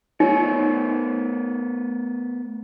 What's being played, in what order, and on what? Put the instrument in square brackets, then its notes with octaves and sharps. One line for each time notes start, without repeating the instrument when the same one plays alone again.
[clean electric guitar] A3 B3 C#5 [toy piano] D#4